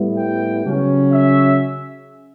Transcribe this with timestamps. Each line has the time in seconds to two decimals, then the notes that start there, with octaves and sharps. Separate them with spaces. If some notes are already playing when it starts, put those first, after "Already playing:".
Already playing: A2 G3 B3 E4
0.16 G5
0.65 C#3 F#3 C#4
1.13 E5